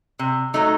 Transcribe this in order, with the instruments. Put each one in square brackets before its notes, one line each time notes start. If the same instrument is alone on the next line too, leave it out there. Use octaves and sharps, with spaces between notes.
[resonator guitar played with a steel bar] C3
F#3 A3 D#4